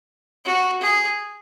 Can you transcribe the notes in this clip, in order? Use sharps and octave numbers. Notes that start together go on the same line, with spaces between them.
F#4
G#4